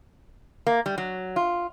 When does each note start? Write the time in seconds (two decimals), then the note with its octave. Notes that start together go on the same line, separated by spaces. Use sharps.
0.67 A#3
0.86 G3
0.98 F#3
1.36 F4